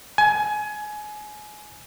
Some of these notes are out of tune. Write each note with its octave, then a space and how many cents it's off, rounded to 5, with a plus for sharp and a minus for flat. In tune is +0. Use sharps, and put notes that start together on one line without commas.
G#5 +25